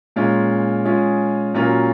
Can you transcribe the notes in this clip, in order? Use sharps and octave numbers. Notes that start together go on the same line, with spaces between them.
A#2 G#3 C#4 F4
G#3 C#4 F4 G#4
A#2 F#3 C#4 F4 A#4